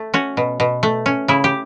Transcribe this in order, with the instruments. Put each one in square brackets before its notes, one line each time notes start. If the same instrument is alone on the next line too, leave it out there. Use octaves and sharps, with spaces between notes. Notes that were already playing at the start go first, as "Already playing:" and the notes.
Already playing: [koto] A3
C#4 F#4
B2
B2
A3
C#4
C#3 E4
G4